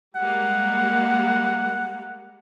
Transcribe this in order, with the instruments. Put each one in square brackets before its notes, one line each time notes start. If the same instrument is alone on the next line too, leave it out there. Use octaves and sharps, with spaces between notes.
[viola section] G3 G#3 A#3 [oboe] F#5